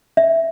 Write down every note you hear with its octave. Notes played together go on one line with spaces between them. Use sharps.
E5